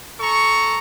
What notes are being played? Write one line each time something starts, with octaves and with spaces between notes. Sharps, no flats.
A4 A#5 C#6